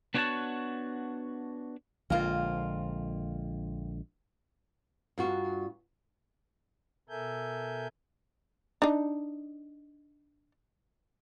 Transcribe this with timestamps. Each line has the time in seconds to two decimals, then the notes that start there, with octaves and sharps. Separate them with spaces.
0.14 B3 D4 F#4 C#5 F#5 A5
2.10 A#1 D3 G#3 A#3 C4 F4
5.18 G2 F4 F#4
7.09 B2 A4 A#4 E5 G#5 G6
8.82 D4 D#4